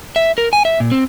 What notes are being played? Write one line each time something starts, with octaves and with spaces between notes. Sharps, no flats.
E5
A#4
G#5
E5
A#2
C4